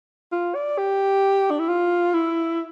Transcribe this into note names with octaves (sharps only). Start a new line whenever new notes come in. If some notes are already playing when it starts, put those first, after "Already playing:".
F4
D5
G4
D4
E4
F4
E4